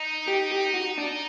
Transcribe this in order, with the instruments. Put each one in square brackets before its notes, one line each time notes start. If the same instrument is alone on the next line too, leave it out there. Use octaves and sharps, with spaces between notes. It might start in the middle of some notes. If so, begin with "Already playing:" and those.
Already playing: [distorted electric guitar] D#4
[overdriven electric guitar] G4
G4
F#4
D4